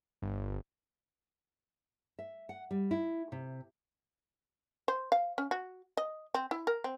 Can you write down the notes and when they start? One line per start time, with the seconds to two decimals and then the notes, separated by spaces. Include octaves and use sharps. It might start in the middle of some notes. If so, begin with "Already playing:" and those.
0.22 G1
2.19 E5
2.49 F#5
2.71 G3
2.91 E4
3.32 C3
4.88 C5
5.12 F5
5.38 C#4
5.51 F#4
5.97 D#5
6.35 C4
6.51 E4
6.67 A#4
6.84 C4